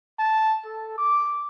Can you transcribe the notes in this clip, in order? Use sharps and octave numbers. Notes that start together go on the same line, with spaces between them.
A5
A4
D6